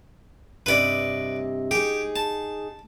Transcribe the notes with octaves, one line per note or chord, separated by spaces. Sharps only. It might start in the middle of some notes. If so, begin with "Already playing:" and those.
G2 C3 B4 D5 D#5
D#4 G4 G#4
A5